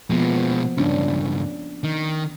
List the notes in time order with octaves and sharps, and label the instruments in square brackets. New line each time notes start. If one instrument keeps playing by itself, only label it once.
[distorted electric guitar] B2 G#3 [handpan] F3 A#3 B3
[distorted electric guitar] C#2 G2 [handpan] C#4 D4
[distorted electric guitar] D#3